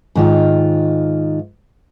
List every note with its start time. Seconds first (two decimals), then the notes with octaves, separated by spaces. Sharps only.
0.15 G#2 D#3 F4